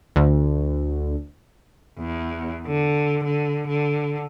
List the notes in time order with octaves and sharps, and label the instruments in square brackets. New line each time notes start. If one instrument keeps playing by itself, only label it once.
[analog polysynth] D2
[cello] E2
D3
D3
D3